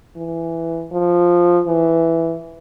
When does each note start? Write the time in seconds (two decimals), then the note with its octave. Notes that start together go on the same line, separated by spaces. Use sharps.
0.17 E3
0.92 F3
1.68 E3